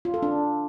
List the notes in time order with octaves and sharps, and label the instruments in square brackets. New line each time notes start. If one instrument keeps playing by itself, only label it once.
[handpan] F4
A4
D4